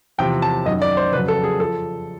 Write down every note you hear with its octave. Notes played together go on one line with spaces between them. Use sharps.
E2 C3 F3 G5
A5
F#2 D#3 F#3 D#5
D5
C5
F2 C#3 F#3 B4
A4
G#4
F3 A4